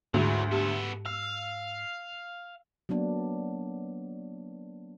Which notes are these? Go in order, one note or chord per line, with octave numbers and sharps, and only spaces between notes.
D2 G#2 E3 F#3 F#4 G#4
B3 G4 A4
F5 E6
F#3 A#3 B3 D4